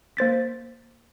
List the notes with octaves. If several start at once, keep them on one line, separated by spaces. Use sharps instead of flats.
A#3 C5 A6 B6